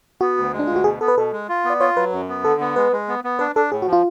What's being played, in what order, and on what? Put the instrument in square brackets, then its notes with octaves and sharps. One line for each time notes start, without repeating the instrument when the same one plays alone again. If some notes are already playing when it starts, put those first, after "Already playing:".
[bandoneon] B3 [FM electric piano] F#4
[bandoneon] D2
G#3
[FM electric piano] D4
[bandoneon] D2 [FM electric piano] F4
[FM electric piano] F#4
[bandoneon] B2 [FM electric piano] G#4
[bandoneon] B3 [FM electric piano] A4
[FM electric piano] B4
[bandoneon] B2 [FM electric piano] A4
[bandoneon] G#3
F4
B3
[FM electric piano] D5
[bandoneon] F4 [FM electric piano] C#5
[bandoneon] F#3 [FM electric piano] B4
[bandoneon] F#2
B3
[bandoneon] D3 [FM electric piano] A4
[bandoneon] B3
[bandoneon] G#3 [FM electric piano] B4
[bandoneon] G#3
B3
B3
[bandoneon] D4 [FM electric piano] B4
[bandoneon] D4 [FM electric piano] A4
[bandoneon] A2 [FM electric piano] G#4
[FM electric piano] F#4
[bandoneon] F3
[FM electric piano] F4